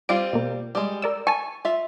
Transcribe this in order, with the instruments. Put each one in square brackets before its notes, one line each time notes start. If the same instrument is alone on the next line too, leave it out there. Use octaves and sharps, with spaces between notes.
[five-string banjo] G3 C4 F4 [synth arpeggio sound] D7
[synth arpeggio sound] B2 A#3
[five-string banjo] G3 G#3
[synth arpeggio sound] A#4 D5 E6
[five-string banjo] G#5 [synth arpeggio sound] A5 C#6
[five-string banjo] F4 E5